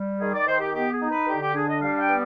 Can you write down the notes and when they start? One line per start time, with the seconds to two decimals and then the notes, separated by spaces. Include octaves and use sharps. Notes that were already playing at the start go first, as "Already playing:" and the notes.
Already playing: G3
0.20 D#3 G#4
0.33 D5
0.46 D#3 C5
0.59 G4
0.73 B3 G4
0.91 G#4
1.01 D#4
1.10 B4
1.27 D3 G4
1.40 G4
1.55 D4 G#4
1.68 D#5
1.81 G3 F5
1.99 G5
2.09 B3